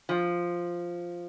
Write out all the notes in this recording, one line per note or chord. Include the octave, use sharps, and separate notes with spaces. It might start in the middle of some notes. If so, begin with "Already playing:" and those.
F3